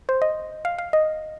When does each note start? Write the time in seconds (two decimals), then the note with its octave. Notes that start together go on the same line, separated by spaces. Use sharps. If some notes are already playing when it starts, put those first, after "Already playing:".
0.09 C5
0.22 D#5
0.65 F5
0.79 F5
0.93 D#5